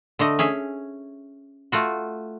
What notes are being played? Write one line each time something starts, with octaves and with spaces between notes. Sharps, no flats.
D3 A3 D#5
C#4 G#4 E5
A3 F4 F#4